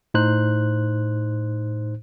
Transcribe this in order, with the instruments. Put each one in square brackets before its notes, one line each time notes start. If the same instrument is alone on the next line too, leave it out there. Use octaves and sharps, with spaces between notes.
[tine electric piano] A2 D#4 C5 F#6